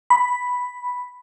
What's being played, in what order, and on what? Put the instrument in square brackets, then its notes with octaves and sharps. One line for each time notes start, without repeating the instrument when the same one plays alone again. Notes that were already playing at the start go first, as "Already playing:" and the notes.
[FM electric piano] B5